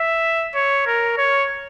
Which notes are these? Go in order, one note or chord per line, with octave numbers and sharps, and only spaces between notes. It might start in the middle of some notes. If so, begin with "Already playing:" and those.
Already playing: E5
C#5
A#4
C#5